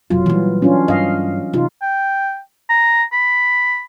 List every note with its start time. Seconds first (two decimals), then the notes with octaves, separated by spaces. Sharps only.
0.10 F1 B1 F#3 F4
0.26 A#2 E3 G3
0.62 C#4 D4 F4
0.88 G2 D#5 F5
1.53 C3 E3 D#4 F4
1.82 G5
2.70 A#5
3.13 B5